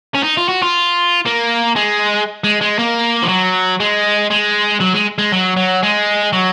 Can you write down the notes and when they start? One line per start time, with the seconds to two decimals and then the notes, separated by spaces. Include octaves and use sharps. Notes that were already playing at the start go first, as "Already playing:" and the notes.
0.15 C#4
0.23 D#4
0.37 F4
0.49 F#4
0.62 F4
1.25 A#3
1.76 G#3
2.44 G#3
2.61 G#3
2.78 A#3
3.22 F3
3.28 F#3
3.80 G#3
4.31 G#3
4.80 F#3
4.94 G#3
5.18 G#3
5.32 F#3
5.57 F#3
5.83 G#3
6.33 F#3